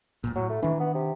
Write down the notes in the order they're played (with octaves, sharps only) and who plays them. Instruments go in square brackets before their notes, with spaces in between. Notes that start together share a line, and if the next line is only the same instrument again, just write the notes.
[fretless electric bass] E1 A#1 A#2
[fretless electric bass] A2 [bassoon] F#3
[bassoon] A3
[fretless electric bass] D#3 D4 [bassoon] E3
[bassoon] B3
C3